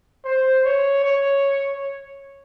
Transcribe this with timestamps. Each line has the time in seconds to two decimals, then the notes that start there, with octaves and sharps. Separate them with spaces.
0.25 C5
0.65 C#5
1.04 C#5